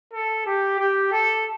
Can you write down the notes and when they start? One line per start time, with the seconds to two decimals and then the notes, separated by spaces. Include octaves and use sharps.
0.13 A4
0.46 G4
0.79 G4
1.12 A4